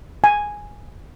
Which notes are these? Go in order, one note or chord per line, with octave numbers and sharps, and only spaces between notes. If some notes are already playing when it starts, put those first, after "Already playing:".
G#5